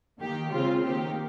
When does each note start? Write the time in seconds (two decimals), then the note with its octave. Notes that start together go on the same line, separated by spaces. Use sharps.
0.20 D#3 A#3 G4
0.52 C#3 G#3 C4 F4
0.84 D#3 A#3 G4